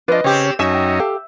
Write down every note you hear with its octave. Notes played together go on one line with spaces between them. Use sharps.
F3 D4 B4 D#5
C#3 C4 C#4 G4
C#5
F#2 C#4 D#4 E5 G#5
G5
G4 A4 F5